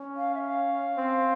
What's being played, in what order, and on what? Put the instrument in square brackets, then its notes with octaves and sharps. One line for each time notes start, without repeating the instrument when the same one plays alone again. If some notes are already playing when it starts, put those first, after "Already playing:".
Already playing: [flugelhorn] C#4
[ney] F5
E5
F5
[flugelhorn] C4